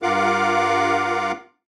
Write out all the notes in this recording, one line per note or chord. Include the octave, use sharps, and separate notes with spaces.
G2 F4 A#4 F5 F#5 D6